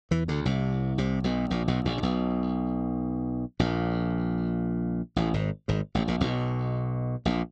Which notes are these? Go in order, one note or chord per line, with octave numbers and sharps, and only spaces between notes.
E2 E3
D2 D3
C2 C3
C2 C3
B1 B2
A#1 A#2
B1 B2
A#1 A#2
C3
B1 B2
A#1 A#2
A1 A2
G#1 G#2
G#1 G#2
A1 A2
A#1 A#2
B1 B2
A#1 A#2